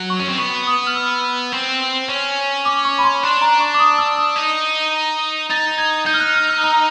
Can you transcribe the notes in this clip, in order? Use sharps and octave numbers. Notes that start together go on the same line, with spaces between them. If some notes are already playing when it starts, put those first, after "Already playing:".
Already playing: F#3
C#6
C#4
C4
B3 C#6
D#6
F6
E6
C4
C#4
D6
C#6
B5
C6
D4
A#5
C#6
D6
D#6
E6
D#6
D#4
D#4 A6
G#6
D#4 G6
F6
F#6
F6
E6
A#5